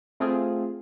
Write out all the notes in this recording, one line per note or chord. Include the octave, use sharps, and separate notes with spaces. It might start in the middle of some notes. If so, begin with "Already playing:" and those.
A3 C4 F4 G#4